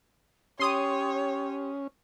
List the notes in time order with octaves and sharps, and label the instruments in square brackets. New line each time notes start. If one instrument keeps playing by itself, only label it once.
[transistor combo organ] C#4 [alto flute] G4 [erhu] C#5 [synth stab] C6 D#6